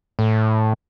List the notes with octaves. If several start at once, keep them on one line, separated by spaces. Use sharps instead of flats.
A2